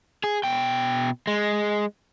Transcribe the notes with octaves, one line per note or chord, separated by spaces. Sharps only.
G#4
B2 G5
G#3